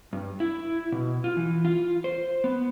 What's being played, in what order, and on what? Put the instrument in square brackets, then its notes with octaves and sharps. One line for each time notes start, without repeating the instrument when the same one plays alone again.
[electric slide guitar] G2
E4
B2
F4
E3
F4
C5
B3